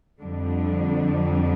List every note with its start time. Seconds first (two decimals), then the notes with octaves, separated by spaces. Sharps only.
0.21 F2 D3 G3 D4